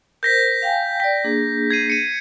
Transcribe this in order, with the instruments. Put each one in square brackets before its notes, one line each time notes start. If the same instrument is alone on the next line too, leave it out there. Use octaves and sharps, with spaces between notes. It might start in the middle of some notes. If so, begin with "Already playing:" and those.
[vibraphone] A#4 C5 [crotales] G6 A#6 B6
[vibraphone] F5 G5 G#5
[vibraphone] D5 G5 [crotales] B6
[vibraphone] A#3 D4 G#4
[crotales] G#6 C7 D#7
C#7 D#7